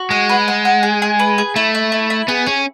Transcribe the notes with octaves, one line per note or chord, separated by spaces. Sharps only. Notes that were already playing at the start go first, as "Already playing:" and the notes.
Already playing: F#4
G#3 F#5
B4
F#5
F#5
G#4
G#4
B4
G#4
A3 E4
E4
E4
E4
B3 G#4
C#4 G#4